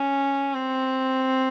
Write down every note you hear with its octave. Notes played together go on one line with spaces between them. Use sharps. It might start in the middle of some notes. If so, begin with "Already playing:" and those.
Already playing: C#4
C4